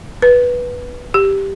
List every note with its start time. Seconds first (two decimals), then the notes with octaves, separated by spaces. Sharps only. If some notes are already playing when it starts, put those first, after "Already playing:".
0.22 B4
1.14 G4